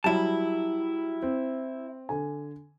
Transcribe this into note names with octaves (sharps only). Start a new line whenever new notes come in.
F#3 G3 E4 A5
C4
D3 G#5